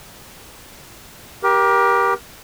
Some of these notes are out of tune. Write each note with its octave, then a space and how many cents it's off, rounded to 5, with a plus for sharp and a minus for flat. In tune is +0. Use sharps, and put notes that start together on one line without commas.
G4 +0 A#4 +30